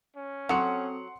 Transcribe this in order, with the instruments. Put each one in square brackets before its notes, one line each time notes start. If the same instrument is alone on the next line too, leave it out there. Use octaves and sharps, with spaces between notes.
[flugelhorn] C#4
[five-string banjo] F#3 [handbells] C4 A4 D#6 [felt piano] F#5 C6 C#7